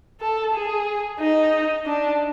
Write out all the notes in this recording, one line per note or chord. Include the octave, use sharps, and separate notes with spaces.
A4
G#4
D#4
D4